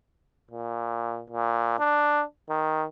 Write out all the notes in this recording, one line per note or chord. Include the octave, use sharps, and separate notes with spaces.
A#2
A#2
D4
D#3